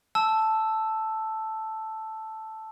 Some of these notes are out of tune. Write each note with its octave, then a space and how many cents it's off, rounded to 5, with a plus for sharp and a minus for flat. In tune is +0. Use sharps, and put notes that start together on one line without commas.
A5 +0 E6 +0